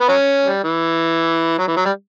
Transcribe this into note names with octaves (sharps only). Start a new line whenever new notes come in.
B3
F#3 C#4
G3
E3
F#3
E3
F#3
G3